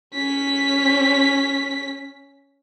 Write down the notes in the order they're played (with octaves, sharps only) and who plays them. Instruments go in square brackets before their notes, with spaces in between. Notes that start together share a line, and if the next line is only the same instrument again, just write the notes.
[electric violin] C#4 B6